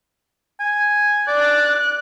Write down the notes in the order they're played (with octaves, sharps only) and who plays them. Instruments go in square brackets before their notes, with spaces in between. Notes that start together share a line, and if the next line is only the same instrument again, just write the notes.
[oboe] G#5
[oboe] D5 [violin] F#6